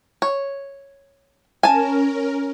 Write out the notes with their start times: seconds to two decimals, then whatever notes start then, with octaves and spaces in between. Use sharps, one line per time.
0.22 C#5
1.63 C#4 A#4 G#5 A5